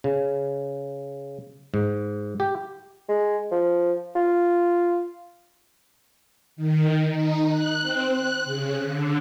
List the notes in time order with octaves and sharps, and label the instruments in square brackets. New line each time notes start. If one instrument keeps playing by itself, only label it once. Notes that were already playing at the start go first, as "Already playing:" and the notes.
[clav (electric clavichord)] C#3
G#2
G4
[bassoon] G#3
F3
F4
[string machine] D#3
D#4
F#6
C4
F#6
C#3
D3